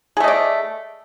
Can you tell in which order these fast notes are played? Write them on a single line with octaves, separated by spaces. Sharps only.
G#4 A3 D#5 D5